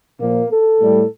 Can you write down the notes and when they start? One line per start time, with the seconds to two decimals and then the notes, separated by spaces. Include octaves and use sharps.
0.20 A#2 F3 A#3
0.50 A4
0.81 A2 G3